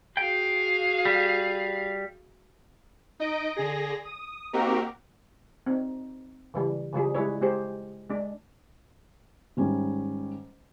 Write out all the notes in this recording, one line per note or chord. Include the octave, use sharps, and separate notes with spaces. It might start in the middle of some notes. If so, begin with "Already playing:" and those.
F#4 G#4 F5 G5
G3
D#4 D#5 D7
D3 G#4 A#6
D#6
A#3 C4 D#4 F#4 G4 A#4
C4 D#4
C#3 E3 G3
C#3 F3 G3 G#4
G3 G#3 E4 G#4 B4 C#5
G#3 G4 G#4 C5 C#5
G#3 D4
G#2 D#3 G3 C#4